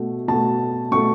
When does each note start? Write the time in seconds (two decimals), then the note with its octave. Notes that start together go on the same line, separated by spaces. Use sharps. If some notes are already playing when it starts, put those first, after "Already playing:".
Already playing: B2 A3
0.28 B2 A3 A5
0.91 B2 A3 C#6